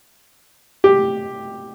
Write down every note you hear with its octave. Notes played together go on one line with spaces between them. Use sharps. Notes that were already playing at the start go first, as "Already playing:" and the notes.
G4